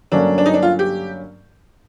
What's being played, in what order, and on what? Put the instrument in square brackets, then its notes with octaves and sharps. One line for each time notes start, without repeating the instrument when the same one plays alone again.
[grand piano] G2 D3 F#3 A#3 C#4 [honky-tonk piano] D4
[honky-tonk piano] D4
D#4
D4
F4
G4